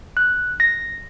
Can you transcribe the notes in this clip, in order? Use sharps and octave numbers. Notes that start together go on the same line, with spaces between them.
F#6
A#6